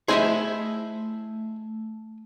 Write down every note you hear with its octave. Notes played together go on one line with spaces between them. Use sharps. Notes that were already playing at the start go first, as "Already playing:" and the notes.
A3 E4 G#4 C5 D#5 E5